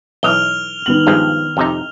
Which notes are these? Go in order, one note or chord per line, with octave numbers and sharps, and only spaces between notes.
B1 E3 D#5 F6 F7 G7
D#3 B3 F#7
G2 F3 G#3
F2 C3 D#4